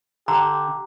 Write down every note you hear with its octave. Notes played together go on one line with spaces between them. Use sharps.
D3 G4 A#5